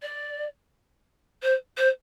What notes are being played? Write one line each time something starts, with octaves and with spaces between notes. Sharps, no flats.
D5
C5
C5